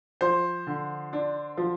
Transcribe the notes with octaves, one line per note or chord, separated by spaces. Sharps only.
F3 C5
D3
D4
F3